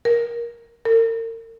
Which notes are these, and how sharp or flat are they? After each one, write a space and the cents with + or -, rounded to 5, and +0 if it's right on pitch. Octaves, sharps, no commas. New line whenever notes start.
A#4 +20
A#4 -40